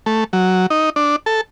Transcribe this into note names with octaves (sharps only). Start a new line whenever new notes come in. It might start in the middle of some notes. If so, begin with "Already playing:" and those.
A3
F#3
D#4
D4
A4